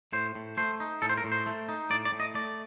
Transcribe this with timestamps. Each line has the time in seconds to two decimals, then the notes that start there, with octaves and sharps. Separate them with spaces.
0.13 A2 C5
0.35 A2
0.57 A3 C5
0.80 D#4
1.02 A2 A4
1.09 C5
1.17 A#4
1.24 A2
1.32 C5
1.46 A3
1.69 D#4
1.90 A2 D5
2.05 D5
2.12 A2
2.20 D#5
2.34 A3 D5